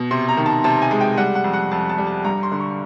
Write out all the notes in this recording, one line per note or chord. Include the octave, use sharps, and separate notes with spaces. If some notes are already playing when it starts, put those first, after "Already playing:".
Already playing: B2
C3 C6
A#5
D#3
A5
C3 A5
G#5
G#3
G5
G3 F#5
F#5
F2
F#5
F2 A5
A5
G3
A5
G2 A#5
C6
D3
C#6